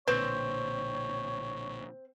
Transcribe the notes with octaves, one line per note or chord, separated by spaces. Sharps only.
B1 A#2 D3 C4 B4 C#5